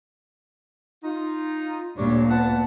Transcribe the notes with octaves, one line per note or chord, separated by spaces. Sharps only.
D#4 F4
D2 A#2 G3 D4 C#5
B3 F#5 A5